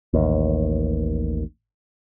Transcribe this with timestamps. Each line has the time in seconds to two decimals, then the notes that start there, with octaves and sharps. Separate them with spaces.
0.14 A1 D#2